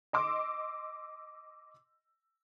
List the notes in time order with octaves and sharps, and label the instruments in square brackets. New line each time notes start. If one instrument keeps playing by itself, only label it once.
[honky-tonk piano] D#5 C6 D6 E6